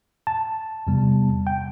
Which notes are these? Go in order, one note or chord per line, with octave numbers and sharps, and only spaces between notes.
A5
E2 C3 G3 B3
G5